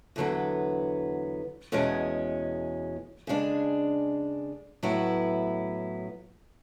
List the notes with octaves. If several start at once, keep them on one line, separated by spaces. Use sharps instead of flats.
E2 D3 F#3 B3
E2 B2 G#3 C#4
C#3 G#3 D4
A2 F#3 B3 E4